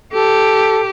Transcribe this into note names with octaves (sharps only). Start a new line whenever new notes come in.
G4 A4